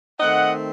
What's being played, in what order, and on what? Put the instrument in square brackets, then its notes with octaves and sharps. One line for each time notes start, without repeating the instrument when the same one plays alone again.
[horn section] D#3 A3 C4 D#5 F#5